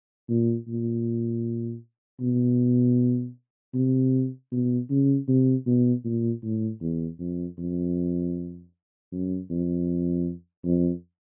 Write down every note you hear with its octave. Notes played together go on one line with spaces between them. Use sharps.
A#2
A#2
B2
C3
B2
C#3
C3
B2
A#2
A2
E2
F2
F2
F#2
F2
F2